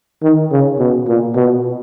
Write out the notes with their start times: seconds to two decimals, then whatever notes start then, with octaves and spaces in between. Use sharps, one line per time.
0.23 D#3
0.51 C#3
0.79 B2
1.08 A#2
1.35 B2